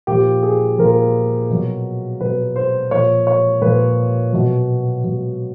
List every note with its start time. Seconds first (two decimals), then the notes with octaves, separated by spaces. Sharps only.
0.07 A#2 F3 G4
0.43 G#4
0.78 A#2 F3 A#4
1.50 B2 F#3
2.21 B2 F#3 B4
2.56 C5
2.91 A#2 F3 C#5
3.27 C#5
3.61 A#2 F3 B4
4.33 B2 F#3
5.04 B2 F#3